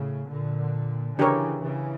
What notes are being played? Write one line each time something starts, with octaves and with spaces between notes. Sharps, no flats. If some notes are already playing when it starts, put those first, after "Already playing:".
Already playing: A2 C#3
A#2 D3
C#3 E3 D4 G4 A#4 C#5
C#3 E3